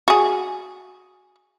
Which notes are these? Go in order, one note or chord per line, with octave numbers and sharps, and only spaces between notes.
F#4 G#4